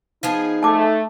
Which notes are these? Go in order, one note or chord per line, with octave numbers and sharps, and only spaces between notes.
F3 B3 D#4 G#4
A3 A5 D6